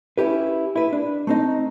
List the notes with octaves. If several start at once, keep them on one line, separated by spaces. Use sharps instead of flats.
C#4 E4 G4 B4
E4 B4
D4
A3 C4 D#4